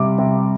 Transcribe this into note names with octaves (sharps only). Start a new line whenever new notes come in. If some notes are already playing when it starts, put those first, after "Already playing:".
Already playing: C3 G3 D6
C3